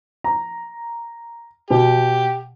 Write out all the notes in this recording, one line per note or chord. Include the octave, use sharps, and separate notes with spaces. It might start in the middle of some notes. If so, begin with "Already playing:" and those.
A#5
B2 G4